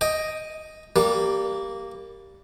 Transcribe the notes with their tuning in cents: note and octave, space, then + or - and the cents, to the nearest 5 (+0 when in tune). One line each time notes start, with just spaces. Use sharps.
D#5 +0 G5 +10
G3 +0 A#3 -10